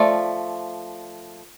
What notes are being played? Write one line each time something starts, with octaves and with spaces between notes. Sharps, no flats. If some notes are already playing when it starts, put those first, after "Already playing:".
Already playing: F3 A3 D5